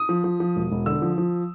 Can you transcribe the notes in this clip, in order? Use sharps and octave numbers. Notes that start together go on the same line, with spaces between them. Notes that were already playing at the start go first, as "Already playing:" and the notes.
Already playing: D#6
F3
F3
F3
E1
E1
D3 E6
F3
F3